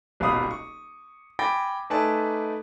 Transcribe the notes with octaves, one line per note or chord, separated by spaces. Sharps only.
D#1 G#1 B2 F5 B5 D#6
C#6
G5 G#5 B5 D6 A6 A#6
A3 D#4 B4 D5 G#5 A5